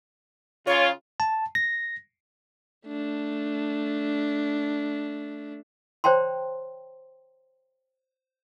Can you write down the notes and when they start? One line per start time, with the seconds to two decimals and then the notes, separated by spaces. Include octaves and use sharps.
0.66 C#3 F4 C#5
1.20 A5
1.55 A#6
2.87 A3 D4
6.04 C5 C#5 G5 A5 C6